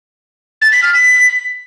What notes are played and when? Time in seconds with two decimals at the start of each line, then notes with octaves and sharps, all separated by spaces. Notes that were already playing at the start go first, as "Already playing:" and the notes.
0.62 A6
0.72 B6
0.83 F6
0.93 B6